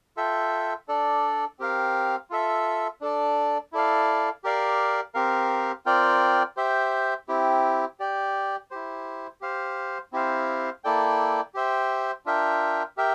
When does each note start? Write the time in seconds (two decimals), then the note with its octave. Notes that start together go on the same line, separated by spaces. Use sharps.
0.17 F4 A4 E5 G5
0.88 D4 A4 D5
1.59 C4 G4 A#4 F5
2.30 F4 A4 E5
3.01 D4 A4 D5
3.73 E4 A4 D5 F5
4.44 G4 A#4 D5 F5
5.15 C4 G4 A#4 F5
5.86 C4 F4 A#4 D5 G5
6.57 G4 C5 E5 G5
7.28 C4 E4 G4
8.00 G4 D5 G5
8.71 E4 G4 C5
9.41 G4 C5 F5
10.13 C4 E4 G4 C5 F5
10.84 A#3 E4 A4 D5 G5
11.54 G4 C5 E5 G5
12.26 D4 F4 A#4 E5 G5
12.97 G4 A#4 E5 G5